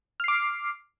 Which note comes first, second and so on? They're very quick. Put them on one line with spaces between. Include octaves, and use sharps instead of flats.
F6 C7 D6